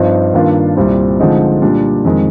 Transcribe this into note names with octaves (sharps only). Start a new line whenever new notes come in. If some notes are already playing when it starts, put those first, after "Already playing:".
Already playing: G2 F3 C4 D#4
G2 D#3 A#3 D4 F4
C2 A#2 G3 C4
D3 F3 G#3 C4 D#4
A#2 G3 D4
F2 D#3 G#3